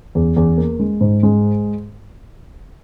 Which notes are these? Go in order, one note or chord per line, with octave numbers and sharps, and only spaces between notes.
E2
E2
A#3
G#3
G#2
G#3